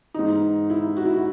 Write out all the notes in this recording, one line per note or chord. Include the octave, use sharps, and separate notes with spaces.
G#2 E3 D#4
E4
F#4
E4
F#4